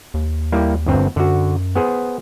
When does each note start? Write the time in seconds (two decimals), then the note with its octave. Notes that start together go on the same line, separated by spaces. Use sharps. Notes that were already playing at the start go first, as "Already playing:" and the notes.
0.14 D#2
0.52 G3 A#3 E4
0.86 G1 G2 C4
1.16 F#2 D3 F#4
1.75 B3 G#4 C5